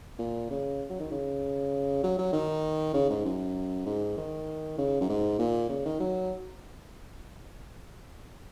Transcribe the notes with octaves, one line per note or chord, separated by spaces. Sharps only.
A#2
C#3
F#3
D#3
C#3
F#3
F#3
D#3
C#3
G#2
F#2
G#2
D#3
C#3
F#2
G#2
A#2
C#3
D#3
F#3